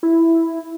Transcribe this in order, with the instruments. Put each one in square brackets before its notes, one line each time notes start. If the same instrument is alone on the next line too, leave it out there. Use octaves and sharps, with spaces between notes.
[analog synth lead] E4